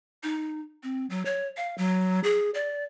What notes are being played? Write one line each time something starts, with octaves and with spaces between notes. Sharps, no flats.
D#4
C4
F#3
C#5
F5
F#3
G#4
D5